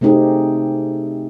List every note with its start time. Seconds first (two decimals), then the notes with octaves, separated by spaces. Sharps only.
0.01 C3 A3 C4 D#4 G4 G#4